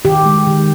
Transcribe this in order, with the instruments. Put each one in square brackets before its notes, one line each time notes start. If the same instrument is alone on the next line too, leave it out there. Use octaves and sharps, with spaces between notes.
[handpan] D#3 G4
G#3
D#3